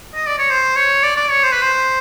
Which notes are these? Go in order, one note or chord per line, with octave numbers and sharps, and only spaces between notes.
D#5
D5
C#5
C5
C#5
D5
D5
C#5
C5
B4
C5